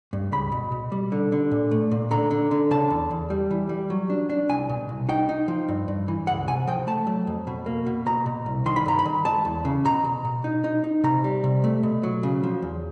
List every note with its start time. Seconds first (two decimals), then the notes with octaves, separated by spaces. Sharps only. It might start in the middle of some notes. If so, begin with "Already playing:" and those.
0.13 G2
0.32 C#2 B5
0.52 B2
0.72 B2
0.92 G3
1.12 D3
1.32 D3
1.51 A#2
1.71 A3
1.91 A#2
2.11 D3 A#5
2.31 D3
2.51 D3
2.71 C#3 A5
2.90 E2
3.11 E2
3.30 G3
3.51 E3
3.69 G3
3.90 F#3
4.10 D4
4.30 D4
4.49 C2 G#5
4.69 B2
4.89 C2
5.09 D#4 G5
5.29 D#4
5.48 F3
5.68 G2
5.88 G2
6.08 E3
6.27 C#2 F#5
6.48 C3 G#5
6.67 F3 G5
6.87 A3 A5
7.07 F#3
7.27 F2
7.47 B2
7.66 A#3
7.86 B2
8.06 B2 A#5
8.26 B2
8.46 C2
8.66 D#3 C6
8.76 B5
8.86 G2 A#5
8.99 B5
9.05 D#3
9.25 G#3 A5
9.45 E2
9.65 C#3
9.85 B2 A#5
10.04 B2
10.25 B2
10.44 D#4
10.64 D#4
10.84 D#4
11.04 C3 A#5
11.24 G3
11.44 C3
11.64 A3
11.83 B2
12.03 F#3
12.23 C#3
12.43 F3
12.62 E2